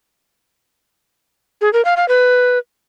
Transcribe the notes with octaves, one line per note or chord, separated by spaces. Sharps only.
G#4
A#4
F5
F5
B4